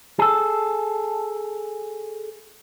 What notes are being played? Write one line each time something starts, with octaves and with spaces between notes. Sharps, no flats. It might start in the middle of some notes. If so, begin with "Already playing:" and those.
G#4 A4